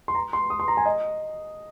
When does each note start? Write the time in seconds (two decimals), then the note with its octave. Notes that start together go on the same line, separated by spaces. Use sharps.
0.08 C6
0.15 A#5
0.33 C6
0.50 D#6
0.60 C6
0.68 A#5
0.77 G#5
0.85 D#5